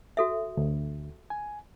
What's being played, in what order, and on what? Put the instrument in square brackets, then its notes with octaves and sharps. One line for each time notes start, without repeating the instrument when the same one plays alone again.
[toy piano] F#4 A4 E5
[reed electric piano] D2
G#5